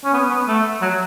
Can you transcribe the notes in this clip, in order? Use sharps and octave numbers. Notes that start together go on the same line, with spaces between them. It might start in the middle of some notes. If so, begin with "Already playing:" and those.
C#4
B3
B3
A3
F#3